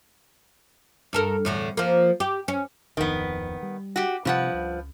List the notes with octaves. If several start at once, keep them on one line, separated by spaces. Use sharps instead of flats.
G2 A4 A#4
E2 A2 D3
F3 A#3
G4
C#4
D1 F2 D#3 B3
G3
F#4 G4
G2 C3 F3 C4 F#5
C#2